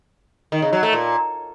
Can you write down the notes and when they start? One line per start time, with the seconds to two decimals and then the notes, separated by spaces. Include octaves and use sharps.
0.52 D#3
0.62 C#3
0.73 F#3
0.83 A3
0.93 A#2